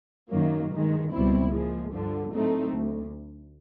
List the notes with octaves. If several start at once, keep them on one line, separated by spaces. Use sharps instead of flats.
F#2 D#3 F#3 A#3
G2 D#3 G#3
C#2 B2 G3 C4 E4
A#2 F3 G#3
G2 D3 F3
A2 F#3 A3 C4 D#4
D2